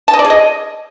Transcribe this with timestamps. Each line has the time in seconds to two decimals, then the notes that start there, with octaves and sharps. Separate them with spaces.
0.08 A5
0.13 D#5
0.19 D5
0.25 G#4
0.30 D#5